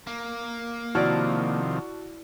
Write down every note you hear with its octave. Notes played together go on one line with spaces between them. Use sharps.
A#3
C3 D#3 F3 E4 F#4 D5 A5 F6